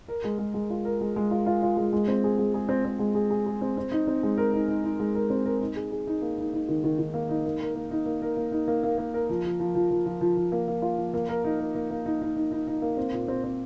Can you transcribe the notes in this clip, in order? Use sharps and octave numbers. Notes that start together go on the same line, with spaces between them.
A#4
G#3
G#3
G#3
F4
A#4
G#3
G#3
F4
F4
F4
G#3
G#3
C4
G#4
G#3
G#4
C4
C4
G#3
G#4
G#4
G#4
C4
C4
D#4
C4
G#3
A#4
D#4
D#4
D#4
G#3
A#4
C4
A#4
D#4
G#4
G#4
D#4
A#3
D#4
D#4
D#3
D#3
D#3
A#3
D#4
A#3
A#4
A#3
D#4
A#3
A#4
A#3
D#4
A#3
A#3
A#3
A#4
F3
F3
F3
F3
F3
F3
F3
F3
A#3
A#3
F4
F3
A#3
A#4
D#4
A#4
A#3
A#3
D#4
D#4
D#4
D#4
D#4
A#3
C4
A#2
C4
C4